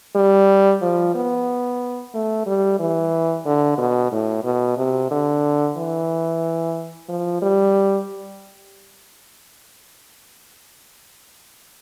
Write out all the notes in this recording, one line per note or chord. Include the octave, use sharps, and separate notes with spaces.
G3
F3
B3
A3
G3
E3
D3
B2
A2
B2
C3
D3
E3
F3
G3